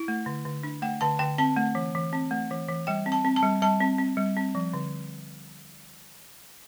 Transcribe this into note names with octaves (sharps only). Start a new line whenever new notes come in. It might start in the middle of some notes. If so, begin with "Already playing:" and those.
Already playing: E4
A3
D3
D3
D4
A3 G5
D3 A5
D3 G5
C4 A5
A3
E3
E3
C4
A3
E3
E3
G3 G5
C4
A5
C4
A5
G3
G3 A5
C4
C4
G3
C4
F3
D3